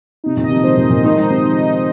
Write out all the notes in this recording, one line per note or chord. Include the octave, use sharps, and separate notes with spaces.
C3 D#4
A#2 D#3
D#5
C3 F3
D#3 G#3 C5
A#2 D#3
C5
A#2 D#3
D#3 G#3 D#4
F3
D#3 G#3
C5
C3 F3
C5
D#4